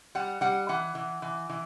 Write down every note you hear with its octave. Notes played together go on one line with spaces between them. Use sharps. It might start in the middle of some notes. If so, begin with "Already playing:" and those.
G3 F#5
G3 F#5
E3 F#5
E3
E3
E3